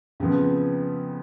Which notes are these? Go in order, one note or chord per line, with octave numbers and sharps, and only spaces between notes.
F2 C#3 F3 B3